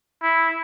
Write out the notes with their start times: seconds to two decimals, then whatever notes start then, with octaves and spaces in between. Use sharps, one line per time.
0.23 E4